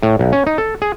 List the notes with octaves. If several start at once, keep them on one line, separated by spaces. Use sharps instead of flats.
A2
B1
C#4
D#4
A4
G#4